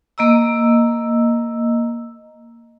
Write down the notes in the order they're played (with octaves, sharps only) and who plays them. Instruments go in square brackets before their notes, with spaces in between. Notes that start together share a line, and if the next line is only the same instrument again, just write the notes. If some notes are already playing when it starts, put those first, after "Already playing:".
[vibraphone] A#3 D#5 A#5 E6